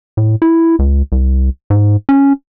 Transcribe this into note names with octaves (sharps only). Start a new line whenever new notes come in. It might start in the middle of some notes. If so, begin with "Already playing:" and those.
A2
E4
C#2
C2
G#2
C#4